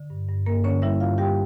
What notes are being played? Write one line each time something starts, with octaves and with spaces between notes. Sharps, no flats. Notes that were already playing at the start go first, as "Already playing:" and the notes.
Already playing: D3
G2
G2
G2 A#3 A#4
D3 C#4 C#5
G3 E4 E5
G2 F4 F5
G3 G4 G5